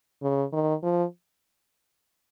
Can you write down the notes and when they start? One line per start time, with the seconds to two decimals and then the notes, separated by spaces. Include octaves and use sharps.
0.23 C#3
0.53 D#3
0.83 F3